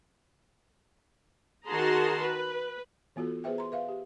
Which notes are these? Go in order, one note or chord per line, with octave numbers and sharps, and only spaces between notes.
D#3 F#4 G#4 A5 A#5 C6
B4
E3 B3 F4 F#4 A4
A4
B3 G#4 B4 C5 E5 G5
A#5 C6
B4 E5 F5
G4